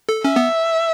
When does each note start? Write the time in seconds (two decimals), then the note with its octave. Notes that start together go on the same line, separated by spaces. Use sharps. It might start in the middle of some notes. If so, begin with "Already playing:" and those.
0.09 A4
0.24 C#4 E5
0.36 B3